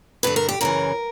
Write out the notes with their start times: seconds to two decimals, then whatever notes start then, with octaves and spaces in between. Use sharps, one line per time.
0.23 G2 D3 B4
0.36 A#4
0.49 G4
0.61 F#2 C#3 E3 A#4